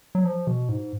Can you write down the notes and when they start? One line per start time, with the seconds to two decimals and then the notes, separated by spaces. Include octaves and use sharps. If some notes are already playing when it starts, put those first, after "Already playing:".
0.15 F#3
0.24 F3
0.47 B2
0.69 G#2